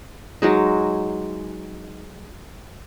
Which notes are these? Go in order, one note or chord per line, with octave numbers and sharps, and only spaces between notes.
F#3 G#3 D#4